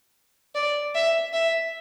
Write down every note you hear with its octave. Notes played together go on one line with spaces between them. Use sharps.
D5
E5
E5